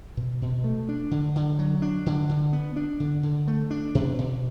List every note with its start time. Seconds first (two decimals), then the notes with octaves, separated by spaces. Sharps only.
0.17 B2
0.42 B2
0.64 A3
0.89 D4
1.11 D3
1.36 D3
1.59 F#3
1.82 D4
2.06 D3
2.29 D3
2.53 B3
2.76 D4
3.00 D3
3.23 D3
3.48 A3
3.71 D4
3.95 B2
4.19 B2